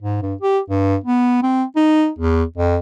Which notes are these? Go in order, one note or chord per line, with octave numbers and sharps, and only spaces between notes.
G#2
G2
G4
G2
B3
C4
D#4
E2
F2